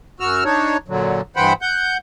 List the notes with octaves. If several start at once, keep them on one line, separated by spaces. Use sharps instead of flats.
F#2 F#4 E6 F6
D4 D#4 C#5
A#2 D3 F#3
G2 E3 C5 F#5 G5 B5
F#5 G6